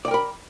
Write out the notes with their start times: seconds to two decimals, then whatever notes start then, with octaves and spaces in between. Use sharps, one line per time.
0.05 D5
0.08 G5
0.11 A#4
0.14 B5